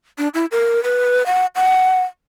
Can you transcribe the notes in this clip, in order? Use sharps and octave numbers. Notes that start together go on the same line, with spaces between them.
D4
E4
A#4
B4
F#5
F#5